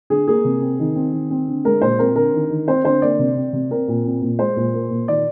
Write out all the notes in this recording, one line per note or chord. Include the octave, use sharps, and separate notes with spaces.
D3 G#4
A#3 G#4
C3
C4
D#3
C4
D#3
C4
D3
G#3 A#4
A#2 C5
C4 A#4
D3 A#4
D#3
D#3
C4 C5
D3 C5
A#3 D5
C3
C4
C3
C4 A#4
A#2
C4
A#2
G#3 C5
A#2
A#3
A#2
D#3 D5